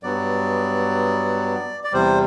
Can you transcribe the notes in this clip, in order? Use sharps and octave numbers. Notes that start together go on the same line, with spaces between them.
G2 F#3 B3 D5
D5
E2 C3 G3 C5